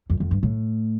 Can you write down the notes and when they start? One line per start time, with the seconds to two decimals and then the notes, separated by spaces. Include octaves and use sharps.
0.10 F2
0.20 F2
0.31 G2
0.43 A2